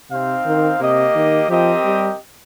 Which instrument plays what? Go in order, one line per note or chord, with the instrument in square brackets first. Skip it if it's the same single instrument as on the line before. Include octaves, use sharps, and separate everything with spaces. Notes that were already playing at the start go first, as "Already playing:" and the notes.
[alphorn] C3 [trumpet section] C4 D#4 C5 F5
[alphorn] D#3
[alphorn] C3 [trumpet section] A#3 G4 D#5
[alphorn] D#3
[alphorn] F3 [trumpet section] C4 G4 A#4 D#5 G5
[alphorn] G3